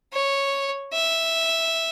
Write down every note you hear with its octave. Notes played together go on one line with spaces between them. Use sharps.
C#5
E5